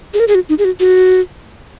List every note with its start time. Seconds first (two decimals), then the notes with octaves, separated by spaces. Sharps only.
0.14 G#4
0.20 A#4
0.28 G#4
0.35 F#4
0.49 D#4
0.59 G#4
0.65 F#4
0.80 F#4